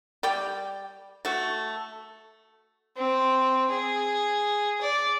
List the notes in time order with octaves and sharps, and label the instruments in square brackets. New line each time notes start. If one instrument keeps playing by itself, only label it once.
[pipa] G3 D5 G5
A3 F#4
[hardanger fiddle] C4
G#4
D5